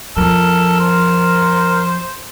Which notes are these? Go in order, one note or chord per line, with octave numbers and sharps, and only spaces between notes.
F2 F3 A4 A#4
C5